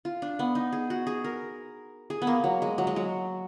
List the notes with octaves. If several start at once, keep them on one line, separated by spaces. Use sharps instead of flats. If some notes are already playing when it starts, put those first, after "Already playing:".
F4
D4
B3
D#4
G#4
F#4
G#4
A#4
G#4
B3
A#3
F#3
G#3
F#3
G#3
F#3